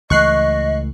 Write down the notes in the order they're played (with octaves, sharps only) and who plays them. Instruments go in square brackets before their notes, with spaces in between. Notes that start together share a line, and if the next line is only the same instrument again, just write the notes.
[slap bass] C#2 E3 A3 [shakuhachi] D#5 [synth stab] C#6 F#6 C7